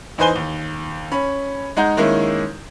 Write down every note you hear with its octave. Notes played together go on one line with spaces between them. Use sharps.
E2 D#4 B4 C5 G#5 G7
D#2
C#4 B5
G#3 D#4 F#5 A#5 G6
D#3 G#3 A#3 C#4 E4